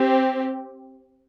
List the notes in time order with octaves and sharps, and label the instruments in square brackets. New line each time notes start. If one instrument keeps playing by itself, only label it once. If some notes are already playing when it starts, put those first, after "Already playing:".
Already playing: [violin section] C4 G4